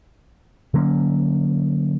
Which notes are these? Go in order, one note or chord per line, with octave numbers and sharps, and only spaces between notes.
D3 F#3 A#3 C#4